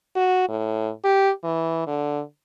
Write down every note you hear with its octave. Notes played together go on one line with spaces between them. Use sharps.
F#4
A2
G4
E3
D3